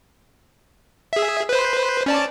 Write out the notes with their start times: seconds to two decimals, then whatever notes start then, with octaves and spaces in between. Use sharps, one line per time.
1.13 G#4 E5
1.49 B4 C5
2.06 C#4 D5 A5